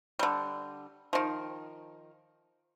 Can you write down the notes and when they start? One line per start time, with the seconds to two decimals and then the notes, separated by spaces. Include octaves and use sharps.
0.19 D3 G3
1.13 D#3 F3